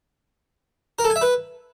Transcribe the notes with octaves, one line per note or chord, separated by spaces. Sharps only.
A#4
A4
G#5
E5
B4